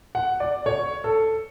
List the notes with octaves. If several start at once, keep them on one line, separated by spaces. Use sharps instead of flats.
F#5
D5
C#5
A4